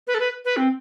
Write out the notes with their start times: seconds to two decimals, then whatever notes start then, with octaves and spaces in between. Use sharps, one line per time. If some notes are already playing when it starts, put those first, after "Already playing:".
0.07 B4
0.14 A4
0.20 B4
0.45 B4
0.57 C4